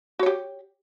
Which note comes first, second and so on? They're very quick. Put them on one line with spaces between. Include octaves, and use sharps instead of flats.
F#4 C#5 G4